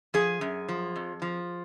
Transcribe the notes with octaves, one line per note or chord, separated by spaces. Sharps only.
F3 G#4
F#2
F3
F2
F3